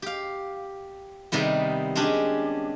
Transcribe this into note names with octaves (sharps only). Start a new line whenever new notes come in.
G4 F5
C3 D#3 G3 B3
G#3 C#4 D4 G4